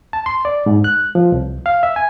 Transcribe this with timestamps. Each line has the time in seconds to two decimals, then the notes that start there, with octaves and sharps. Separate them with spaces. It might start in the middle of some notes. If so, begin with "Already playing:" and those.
0.13 A5
0.26 C6
0.45 D5
0.66 G#2
0.84 F#6
1.15 F3
1.32 C2
1.66 F5
1.83 E5
1.96 G#5